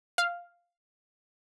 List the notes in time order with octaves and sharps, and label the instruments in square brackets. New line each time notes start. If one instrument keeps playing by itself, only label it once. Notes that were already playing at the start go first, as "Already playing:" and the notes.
[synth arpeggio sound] F5